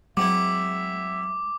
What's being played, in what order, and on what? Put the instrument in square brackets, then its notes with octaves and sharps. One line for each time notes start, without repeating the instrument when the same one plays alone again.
[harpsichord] F#3 C4 E4 [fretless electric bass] G#3 [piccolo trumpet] E5 [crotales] D6